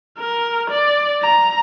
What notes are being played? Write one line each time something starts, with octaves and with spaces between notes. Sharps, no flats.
A#4
D5
A#5